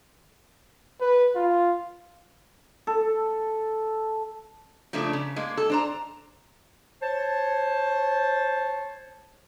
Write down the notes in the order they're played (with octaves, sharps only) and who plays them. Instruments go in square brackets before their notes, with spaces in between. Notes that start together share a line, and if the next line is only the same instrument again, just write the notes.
[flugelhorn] B4
F4
[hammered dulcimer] A4
[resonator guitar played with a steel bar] C#3 F3 A3 A#3 D4
C#3
G#3 A#3
A4
D4 C5 A#5
[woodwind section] C5 C#5 A5